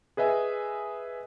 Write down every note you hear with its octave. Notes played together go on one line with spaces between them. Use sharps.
G#4 B4 D#5 E5 G#5